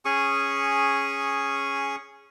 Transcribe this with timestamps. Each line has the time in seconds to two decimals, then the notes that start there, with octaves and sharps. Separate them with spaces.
0.05 C#4 G#4 C#6 D#6